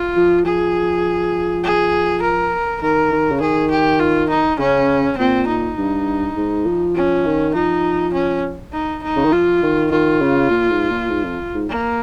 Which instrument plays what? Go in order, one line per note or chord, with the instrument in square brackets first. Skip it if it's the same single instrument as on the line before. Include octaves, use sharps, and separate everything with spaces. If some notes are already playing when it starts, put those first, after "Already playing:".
Already playing: [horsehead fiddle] F4
[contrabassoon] F3
[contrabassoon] F3 [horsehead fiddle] G#4
[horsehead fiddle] G#4
A#4
[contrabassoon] D#3 [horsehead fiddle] A#4
[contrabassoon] D#3
C#3
[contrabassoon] D#3 [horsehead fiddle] G#4
[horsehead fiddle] G4
F4
D#4
[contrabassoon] C#3 [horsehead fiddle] C#4
[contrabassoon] A#2 [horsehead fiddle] C4
[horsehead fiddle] D#4
[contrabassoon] G2
G#2
F3
[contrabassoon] F3 [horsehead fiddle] C#4
[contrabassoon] D#3
[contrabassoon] F3 [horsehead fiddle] D#4
[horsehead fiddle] C#4
D#4
D#4
[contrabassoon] C#3
D#3
[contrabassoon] F3 [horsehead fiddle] F4
[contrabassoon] D#3
[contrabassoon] D#3 [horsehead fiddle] F4
[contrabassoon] C#3
A#2
G#2
A#2
G#2
F2
G#2
[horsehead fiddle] A#3